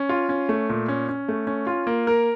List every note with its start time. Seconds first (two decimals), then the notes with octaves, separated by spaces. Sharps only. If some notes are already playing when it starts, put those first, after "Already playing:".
Already playing: C#4
0.09 F4
0.29 C#4
0.49 A3
0.69 A#2
0.88 C#4
1.09 C#4
1.28 A3
1.47 C#4
1.67 F4
1.87 A#3
2.07 A#4